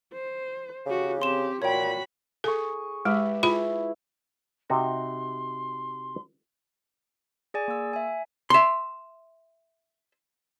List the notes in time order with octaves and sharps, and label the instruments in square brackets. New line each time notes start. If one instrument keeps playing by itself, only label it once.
[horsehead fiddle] C5
[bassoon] C#3 [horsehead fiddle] F#4 G4
[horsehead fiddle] C4 G4 [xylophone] C6 E7
[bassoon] A#2 [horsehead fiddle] F#4 B5 [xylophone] C#5 G5
[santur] G#4 C#6 [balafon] A4
[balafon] G#3 [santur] G4 B4 E5
[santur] E4 G#4 [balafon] F4 E5 B5
[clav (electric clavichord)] C3 D#4 F#4 [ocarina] C6
[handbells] G#4 D5 G#5
A#3 E6
E5 G#5
[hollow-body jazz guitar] E5 C6